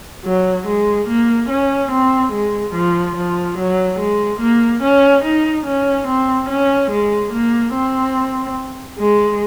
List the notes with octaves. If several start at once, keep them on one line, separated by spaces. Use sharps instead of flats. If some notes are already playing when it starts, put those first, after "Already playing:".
F#3
G#3
A#3
C#4
C4
G#3
F3
F3
F#3
G#3
A#3
C#4
D#4
C#4
C4
C#4
G#3
A#3
C4
G#3